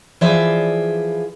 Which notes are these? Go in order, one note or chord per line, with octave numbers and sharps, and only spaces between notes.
E3 F3 G#4 C5 D5 E5